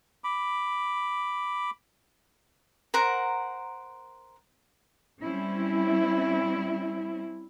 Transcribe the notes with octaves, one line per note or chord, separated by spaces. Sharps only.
B5 D6
A#4 C5 F#5 A#5
G3 C4 C#4 E4